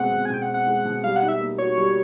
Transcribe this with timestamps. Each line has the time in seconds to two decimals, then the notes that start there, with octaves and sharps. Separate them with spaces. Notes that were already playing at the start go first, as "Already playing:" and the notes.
Already playing: B2 G#3 C4 F#5
0.12 B2
0.25 G#5
0.30 B2 G5
0.42 F#5
0.49 C4
0.54 F#5
0.67 G#3
0.85 B2
1.04 G3 F5
1.16 F#5
1.22 D#4
1.28 E5
1.41 A#3
1.58 F#4 C#5
1.77 G3